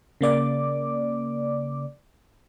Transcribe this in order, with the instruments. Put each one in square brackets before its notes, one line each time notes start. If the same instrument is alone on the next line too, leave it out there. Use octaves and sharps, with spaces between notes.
[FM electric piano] C#3 A#3 D5 D6